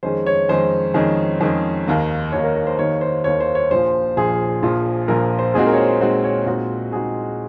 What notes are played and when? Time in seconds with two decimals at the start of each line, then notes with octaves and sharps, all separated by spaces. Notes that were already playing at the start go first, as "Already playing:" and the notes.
0.03 F2 D#3 G#3 C#4 G#4 C5
0.26 C#5
0.49 F2 D#3 G#3 C#4 G#4 C5
0.94 F2 D#3 G#3 C#4 G#4
1.41 F2 D#3 G#3 C#4 G#4
1.87 D#2 D#3 A#3
2.32 D#2 D#3 A#3 C#5
2.44 A#4
2.55 A#4
2.67 C5
2.78 D#2 D#3 A#3 C#5
3.01 C5
3.24 D#2 D#3 A#3 C#5
3.40 C5
3.55 C#5
3.71 A#1 A#2 F3 C5
4.17 A#1 A#2 F3 G#4
4.63 A#1 A#2 F3
5.08 A#1 A#2 F3 A#4
5.39 C5
5.54 A#2 G#3 C4 D#4 F#4 G#4
5.67 A#4
5.73 C#5
5.78 C5
6.00 A#2 G#3 C4 D#4 F#4 C5
6.24 C#5
6.46 A#2 G#3 C4 D#4 F#4
6.92 A#2 G#3 C4 D#4 F#4 G#4